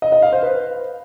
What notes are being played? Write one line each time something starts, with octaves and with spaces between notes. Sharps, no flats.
D#5
D#5
F5
C5
B4